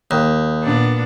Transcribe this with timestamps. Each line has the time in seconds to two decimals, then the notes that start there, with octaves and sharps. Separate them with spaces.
0.11 D#2
0.64 A#2 B3 D4